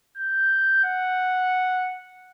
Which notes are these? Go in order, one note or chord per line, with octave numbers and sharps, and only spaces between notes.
G6
F#5